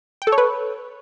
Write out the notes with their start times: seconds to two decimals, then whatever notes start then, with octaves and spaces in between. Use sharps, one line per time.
0.22 G5
0.27 A4
0.32 C#5
0.38 B4